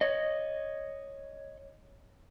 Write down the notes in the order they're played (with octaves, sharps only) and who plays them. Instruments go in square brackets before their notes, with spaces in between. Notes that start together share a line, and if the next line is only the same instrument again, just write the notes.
[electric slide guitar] C#5 D#5